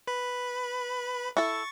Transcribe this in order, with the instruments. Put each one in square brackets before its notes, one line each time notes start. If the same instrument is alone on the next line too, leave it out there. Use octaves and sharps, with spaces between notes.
[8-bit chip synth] B4 B5
[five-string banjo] E4 A4 [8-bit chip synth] C#6 A6